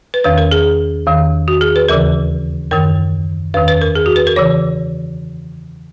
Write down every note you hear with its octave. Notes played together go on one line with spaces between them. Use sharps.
B4
E2 D#3 B4
A#4
G#4
E2 D#3
F#4
G#4
B4
D#2 C#3 E3 A#4
F#2 D#3 A#4
E2 D#3 B4
B4
A#4
G#4
F#4
B4
A#4
C#3 E3 C#5